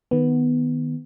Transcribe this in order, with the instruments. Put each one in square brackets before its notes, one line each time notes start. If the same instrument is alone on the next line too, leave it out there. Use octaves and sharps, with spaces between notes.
[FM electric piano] D#3 B3